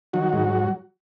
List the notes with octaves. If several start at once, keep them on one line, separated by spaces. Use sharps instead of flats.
D#3 F#3 F#4
G#2